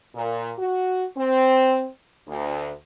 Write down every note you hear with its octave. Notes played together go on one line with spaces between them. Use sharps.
A#2
F#4
C4
D2